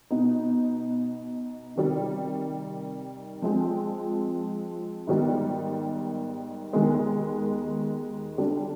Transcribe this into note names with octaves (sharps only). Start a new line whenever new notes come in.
B2 B3 D#4
C3 D#3 G3
F3 G#3 C4
G#2 D#3 G3 B3
D#2 D#3 G#3 B3
D3 G3 D4